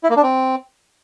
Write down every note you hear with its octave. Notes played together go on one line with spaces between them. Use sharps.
E4
A#3
D4
C4